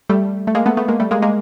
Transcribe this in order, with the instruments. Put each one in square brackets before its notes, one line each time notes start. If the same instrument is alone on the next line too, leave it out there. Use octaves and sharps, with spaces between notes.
[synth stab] G3 A3
A3
G#3 A#3
A3 B3
A3 B3
G#3 A#3
G3 A3
G#3 A#3
G#3 A#3